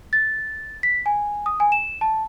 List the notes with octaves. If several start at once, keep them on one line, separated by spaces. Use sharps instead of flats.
A6
B6
G#5
D#6
G#5
E7
A5